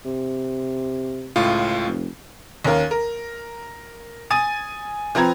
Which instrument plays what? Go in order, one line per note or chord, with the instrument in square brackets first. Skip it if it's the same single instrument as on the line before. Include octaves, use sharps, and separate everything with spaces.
[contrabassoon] C3
[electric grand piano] C#2 A2 F4
[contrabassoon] F1
[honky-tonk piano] D#2 C#4 A#4 F5
A#4
G#5 D#6 A6 D#7
F3 C4 B4 A#5 G#6